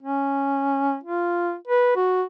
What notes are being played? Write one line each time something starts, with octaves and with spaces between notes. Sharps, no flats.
C#4
F4
B4
F#4